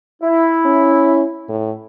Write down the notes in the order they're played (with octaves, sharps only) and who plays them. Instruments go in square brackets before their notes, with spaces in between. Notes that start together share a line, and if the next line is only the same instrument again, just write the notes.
[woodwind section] E4
[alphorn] C#4
A2